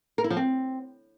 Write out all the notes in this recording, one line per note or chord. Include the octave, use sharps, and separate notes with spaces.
A#4
E4
F3
C4